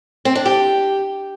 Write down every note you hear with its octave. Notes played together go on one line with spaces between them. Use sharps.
C4
D4
G4